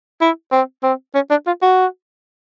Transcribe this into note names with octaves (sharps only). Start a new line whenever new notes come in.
E4
C4
C4
C#4
D4
F4
F#4